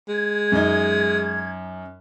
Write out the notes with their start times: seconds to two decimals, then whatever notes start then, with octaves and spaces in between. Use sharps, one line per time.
0.08 G#3 G#6
0.52 F#2 D#4